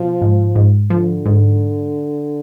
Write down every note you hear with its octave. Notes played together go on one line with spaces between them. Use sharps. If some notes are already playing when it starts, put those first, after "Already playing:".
Already playing: B2 F3
G#2
G#2
D3 F3
G#2